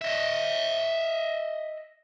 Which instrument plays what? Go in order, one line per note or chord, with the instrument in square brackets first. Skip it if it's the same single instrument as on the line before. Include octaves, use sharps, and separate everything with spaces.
[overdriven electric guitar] D#5 E5